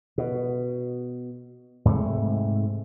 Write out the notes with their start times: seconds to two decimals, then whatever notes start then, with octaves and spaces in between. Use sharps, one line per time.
0.18 B2
1.85 G#2 C3 G#3 A3